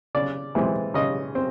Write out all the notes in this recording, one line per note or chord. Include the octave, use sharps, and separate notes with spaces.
C#3 D5
E3 G#3 C4
C#3 D#5
C4